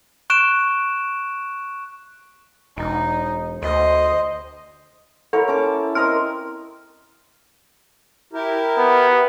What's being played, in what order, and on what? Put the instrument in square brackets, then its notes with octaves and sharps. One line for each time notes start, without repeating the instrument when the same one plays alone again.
[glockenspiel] C#6 F#6 D7 E7
[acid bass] E1 [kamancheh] D#4
[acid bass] D2 [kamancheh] C5 D#5
[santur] E4 A#4 C#5 [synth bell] A4
[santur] C#4 A5 D6
[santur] C4 A#4 D#5 [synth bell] F6
[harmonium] E4 G4 A#4
[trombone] B3